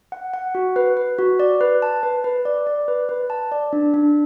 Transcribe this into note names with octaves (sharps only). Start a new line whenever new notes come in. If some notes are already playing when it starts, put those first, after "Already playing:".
F#5
F#5
F#4
B4
B4
F#4
D5
B4
A5
B4
B4
D5
D5
B4
B4
A5
D5
D4
D4